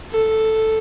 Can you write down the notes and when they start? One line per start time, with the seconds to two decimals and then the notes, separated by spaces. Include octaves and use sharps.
0.11 A4